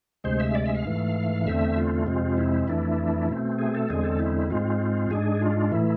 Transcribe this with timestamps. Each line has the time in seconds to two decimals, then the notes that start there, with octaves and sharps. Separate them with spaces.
0.24 D2 C3 G#3 C5
0.40 E5
0.55 D5
0.66 E5
0.75 F5
0.86 G#2 E3 A3
1.45 E2 D3 A3 C4 E5
1.77 F4
2.06 F2 C3 G#3 C4
2.37 E4
2.68 F2 E3 A3 D4
3.29 B2 A3 C4
3.59 G#4
3.75 A4
3.89 E2 D3 G#3 C4 G#4
4.04 A4
4.19 E4
4.50 G#2 G#3 C4 F4
5.11 G#2 G#3 D4 G#4
5.41 F4
5.72 A2 E3 A3 E4